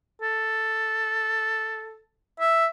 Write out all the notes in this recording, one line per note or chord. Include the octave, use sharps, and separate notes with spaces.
A4
E5